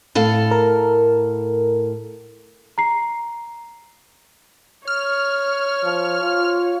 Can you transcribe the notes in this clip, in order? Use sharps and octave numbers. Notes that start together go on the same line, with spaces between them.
A2 A4 F5
A#4
A#5 C7
C#5 F6
F3
F4